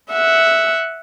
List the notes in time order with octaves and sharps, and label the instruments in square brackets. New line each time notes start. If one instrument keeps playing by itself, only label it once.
[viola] E5 F#5